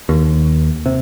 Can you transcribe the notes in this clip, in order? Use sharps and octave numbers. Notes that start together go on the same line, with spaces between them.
D#2
C3